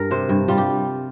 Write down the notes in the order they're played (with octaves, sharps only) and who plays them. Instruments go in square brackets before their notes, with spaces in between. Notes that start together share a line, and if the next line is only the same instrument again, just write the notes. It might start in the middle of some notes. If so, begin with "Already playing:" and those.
Already playing: [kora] G2 A#4
C3 C5
G2
G3 F4
G4